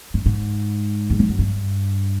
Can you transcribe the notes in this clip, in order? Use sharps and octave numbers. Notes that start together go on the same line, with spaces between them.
G2
G#2
E2
F2
F#2
G2